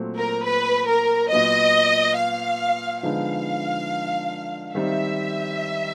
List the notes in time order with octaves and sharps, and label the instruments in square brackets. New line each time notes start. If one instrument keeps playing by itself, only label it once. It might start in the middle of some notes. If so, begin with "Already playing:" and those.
Already playing: [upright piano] A#2 F#3 A3 C4
[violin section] A#4
B4
A#4
[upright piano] A#2 F#3 B3 [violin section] D#5
[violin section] F5
[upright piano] D3 F3 G#3 B3 D#4 [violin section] F5
[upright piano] D#3 G3 C4 D#4 [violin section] E5